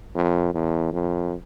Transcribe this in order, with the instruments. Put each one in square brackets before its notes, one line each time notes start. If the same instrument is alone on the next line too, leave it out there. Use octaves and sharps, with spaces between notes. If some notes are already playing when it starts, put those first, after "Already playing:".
[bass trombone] F2
E2
F2